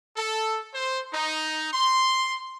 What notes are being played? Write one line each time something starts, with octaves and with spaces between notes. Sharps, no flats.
A4
C5
D#4
C6